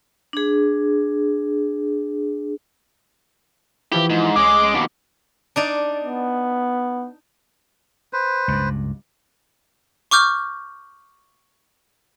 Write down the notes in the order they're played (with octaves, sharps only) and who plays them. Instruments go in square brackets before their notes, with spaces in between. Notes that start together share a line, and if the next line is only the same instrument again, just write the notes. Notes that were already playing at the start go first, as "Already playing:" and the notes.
[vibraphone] D4 G#4
[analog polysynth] E3 F3 E4 [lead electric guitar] G4
[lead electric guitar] G#2
[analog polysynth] C2 C#4 [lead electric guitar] G#3 G#4 [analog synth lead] D6
[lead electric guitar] D#2 B2
[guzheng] D4 D#4 D5
[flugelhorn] B3
[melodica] B4 C5
[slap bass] C#2 G2
[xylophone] C#6 D6 F6 G6